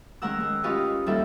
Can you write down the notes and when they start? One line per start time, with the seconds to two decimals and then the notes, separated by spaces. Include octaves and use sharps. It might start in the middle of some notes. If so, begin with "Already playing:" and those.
0.22 D#3 G#3 C#4 A#4 F#5 E6
0.40 G#3
0.64 C#4 F4 G4 B4 C#5 D#5
1.06 D#2 G3 D#4 A4 E5 F#5